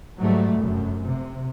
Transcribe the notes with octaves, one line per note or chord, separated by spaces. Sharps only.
G#2 F#3 G3 A3
F1 F#2
C3